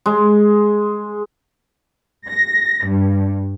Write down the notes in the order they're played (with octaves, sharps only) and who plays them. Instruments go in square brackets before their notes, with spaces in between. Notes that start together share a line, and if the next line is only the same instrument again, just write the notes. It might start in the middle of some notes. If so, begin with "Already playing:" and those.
[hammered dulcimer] G#3
[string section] A#6
G2